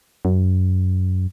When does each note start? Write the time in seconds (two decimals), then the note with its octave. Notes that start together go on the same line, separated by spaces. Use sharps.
0.25 F#2